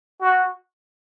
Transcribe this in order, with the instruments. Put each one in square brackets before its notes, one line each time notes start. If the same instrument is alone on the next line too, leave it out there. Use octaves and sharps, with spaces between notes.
[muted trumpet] F#4